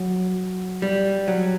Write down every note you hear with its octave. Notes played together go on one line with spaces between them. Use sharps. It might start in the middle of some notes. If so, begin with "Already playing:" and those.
Already playing: F#3
G3
F#3